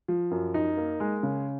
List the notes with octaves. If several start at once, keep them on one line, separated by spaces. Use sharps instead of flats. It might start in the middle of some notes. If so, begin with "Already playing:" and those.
F3
F#2
D#4
A#3
G#3
C#3